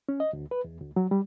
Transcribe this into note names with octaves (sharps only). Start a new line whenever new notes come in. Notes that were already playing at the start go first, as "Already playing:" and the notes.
C#4
D#5
D2
B4
E2
D2
F#3
G3